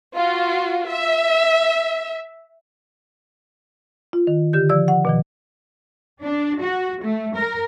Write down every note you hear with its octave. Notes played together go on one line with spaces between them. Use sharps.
F4 F#4
E5
F4
D#3
D3 G4 G6
F3 D5 E6
F#5
B2 D#3 F3
D4
F#4
A3
A#4